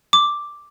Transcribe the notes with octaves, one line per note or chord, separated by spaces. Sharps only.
D6